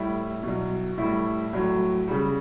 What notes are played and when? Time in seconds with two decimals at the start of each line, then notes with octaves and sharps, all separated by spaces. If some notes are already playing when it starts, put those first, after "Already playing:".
Already playing: A2 G3 E4
0.43 B2 F#3
0.98 A2 G3 E4
1.53 A2 F#3
2.08 C#3 G3